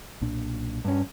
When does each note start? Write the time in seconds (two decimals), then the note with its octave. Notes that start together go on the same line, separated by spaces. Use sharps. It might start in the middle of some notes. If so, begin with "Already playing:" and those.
0.21 B1 A#2 D4
0.85 G2 C#4